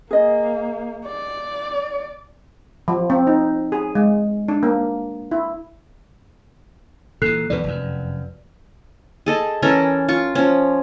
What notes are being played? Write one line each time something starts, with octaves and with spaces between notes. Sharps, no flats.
A#3 G#4 D#5
D5
F3
C4
D#4
G#4
G#3
D4
A#3
E4
A#2 E3 A4 F#6 C7
E2 B2 E3 B4 D5
F1 F#2
G#4 A4 D#5
E3 C#4 A4 A#4
F4 C#6
F3 C#4